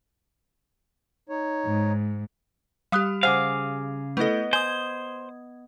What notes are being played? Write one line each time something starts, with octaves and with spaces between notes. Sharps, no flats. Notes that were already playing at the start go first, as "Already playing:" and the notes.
D#4 C#5
G#2
G3 G4 F5 D#6 F#6
C#3 G#4 C5 F5 F#5 D6 F6
A3 B3 E4 A4 D#5
C5 G#5 D#6 G#6